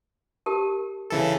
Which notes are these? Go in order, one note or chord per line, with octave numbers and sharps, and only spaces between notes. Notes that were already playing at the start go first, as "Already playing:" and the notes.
G4 A#4 A5
C#3 E3 A4